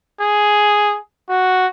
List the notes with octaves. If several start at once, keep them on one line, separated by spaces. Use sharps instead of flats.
G#4
F#4